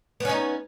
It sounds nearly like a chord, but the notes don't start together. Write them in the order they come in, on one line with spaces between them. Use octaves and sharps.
B3 C#4 D#4